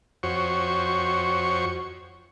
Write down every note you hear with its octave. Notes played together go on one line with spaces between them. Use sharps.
F2 F#4 C5 C#5 C#6